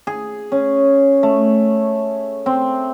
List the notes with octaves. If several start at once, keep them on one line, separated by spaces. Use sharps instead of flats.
G#4
C#4
A3
C4